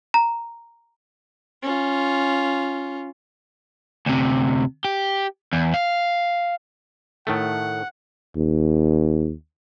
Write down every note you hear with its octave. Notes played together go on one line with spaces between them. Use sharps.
A#5
C#4 F4
D2 C3
G4
E2
F5
A2 D#3 A3 F#5
D#2